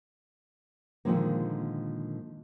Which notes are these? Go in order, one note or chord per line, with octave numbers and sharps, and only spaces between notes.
A#2 D3 D#3 F3 G#3 A#3